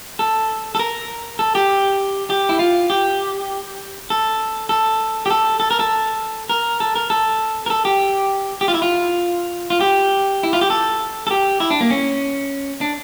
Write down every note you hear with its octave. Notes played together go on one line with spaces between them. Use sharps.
A4
A4
A#4
A4
G4
G4
E4
F4
G4
A4
A4
G4
A4
A4
A#4
A4
A#4
A4
A#4
A4
A#4
A4
G4
G4
F4
E4
F4
F4
G4
E4
F4
G4
A4
A4
G4
E4
D4
A#3
C#4
D4